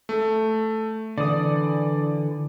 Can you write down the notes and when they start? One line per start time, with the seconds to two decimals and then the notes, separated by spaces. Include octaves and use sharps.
0.09 A3
1.18 D3 E3 D5 D#6